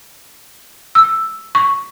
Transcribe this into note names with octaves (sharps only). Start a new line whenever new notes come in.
E6
C#6